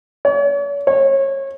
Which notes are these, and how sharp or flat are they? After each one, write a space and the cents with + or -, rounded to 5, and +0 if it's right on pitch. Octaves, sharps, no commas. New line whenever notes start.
C#5 +40
C#5 -30